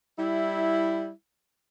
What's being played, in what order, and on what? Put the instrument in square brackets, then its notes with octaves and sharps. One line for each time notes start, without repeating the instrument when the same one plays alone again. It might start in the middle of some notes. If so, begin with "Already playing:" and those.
[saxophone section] G3 E4